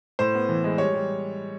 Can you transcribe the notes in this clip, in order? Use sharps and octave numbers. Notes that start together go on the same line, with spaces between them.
A2 C5
B3
E3
G#3
G3 C#5
G3